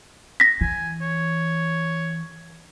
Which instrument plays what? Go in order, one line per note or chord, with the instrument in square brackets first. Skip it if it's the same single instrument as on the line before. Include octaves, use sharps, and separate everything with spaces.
[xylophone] A#6 B6
[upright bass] E3 [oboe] G#5
[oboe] C#5